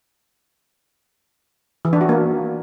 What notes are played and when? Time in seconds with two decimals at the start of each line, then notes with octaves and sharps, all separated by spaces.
1.85 E3
1.93 D4
2.01 F#4
2.09 A#3